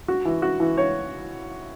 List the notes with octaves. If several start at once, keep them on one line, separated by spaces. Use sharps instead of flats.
F#4
E3
F#4
E3
C#5